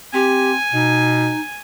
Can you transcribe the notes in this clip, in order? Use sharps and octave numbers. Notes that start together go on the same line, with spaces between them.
C4 G4 G#5
B2 D#4